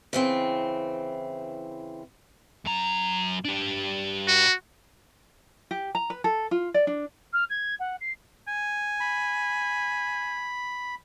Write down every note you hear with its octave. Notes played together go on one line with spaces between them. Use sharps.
C#3 E3 C4
F#2 A#5
D4 G4
F#4
G4
A#5
B4
A4
F4
D5
D4
F6
G#6
F#5
C7
G#5
B5